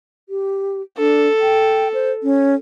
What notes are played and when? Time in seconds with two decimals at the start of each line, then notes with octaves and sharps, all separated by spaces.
0.29 G4
0.98 D4 A4
1.40 G5
1.94 C5
2.23 C#4